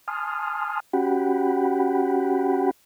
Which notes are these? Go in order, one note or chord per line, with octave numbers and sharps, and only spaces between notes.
G#5 A5 C6 D#6 F6
C#4 F#4 G4 F#5 G5 B5